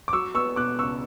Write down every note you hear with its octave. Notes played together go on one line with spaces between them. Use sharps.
D6
F#3 C#6 E6
B3 C#6 E6
B2 D6 F#6
C#2 C#6 E6